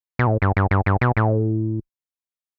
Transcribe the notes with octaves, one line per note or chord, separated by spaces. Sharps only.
B2
A2
G2
G2
G2
G2
B2
A2